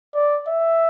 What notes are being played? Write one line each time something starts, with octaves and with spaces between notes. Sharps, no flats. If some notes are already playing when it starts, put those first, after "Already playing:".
D5
E5